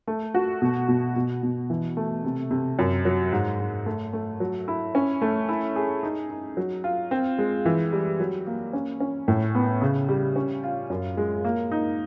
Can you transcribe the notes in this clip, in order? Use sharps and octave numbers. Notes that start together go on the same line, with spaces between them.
A3
F#4
B2
B2
B2
B2
E3
A3
C3
C3
F#2
F#3
G#2
G#2
A3
A3
F#3
E4
C#4
A3
E4
G#4
D#4
D#4
F#3
F4
C4
G#3
E3
G3
F#3
A#3
C#4
C#4
A2
B3
C#3
G3
C#4
F4
F#2
G#3
A#3
D#4